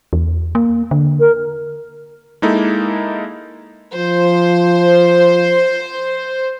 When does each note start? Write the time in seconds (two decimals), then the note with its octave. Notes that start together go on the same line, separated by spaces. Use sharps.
0.13 E2
0.55 A#3
0.91 D3
1.20 A#4
2.42 G#3 A#3 D#4 E4 A4
3.95 F3 C5